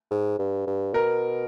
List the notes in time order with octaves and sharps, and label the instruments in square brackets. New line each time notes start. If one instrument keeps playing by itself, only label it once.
[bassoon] G#2
G2
G2
[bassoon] B2 [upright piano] A#4